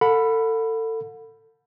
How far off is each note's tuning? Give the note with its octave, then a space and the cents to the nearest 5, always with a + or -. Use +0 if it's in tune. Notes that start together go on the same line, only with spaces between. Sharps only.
A4 +30 F#5 -35 B5 +0